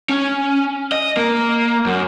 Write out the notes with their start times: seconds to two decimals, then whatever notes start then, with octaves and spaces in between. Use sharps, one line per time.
0.09 C#4
0.92 D#5
1.17 A#3
1.86 F#2